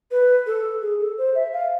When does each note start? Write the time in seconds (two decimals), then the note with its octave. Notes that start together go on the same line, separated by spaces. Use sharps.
0.11 B4
0.46 A4
0.82 G#4
1.00 A4
1.18 C5
1.35 E5
1.53 F5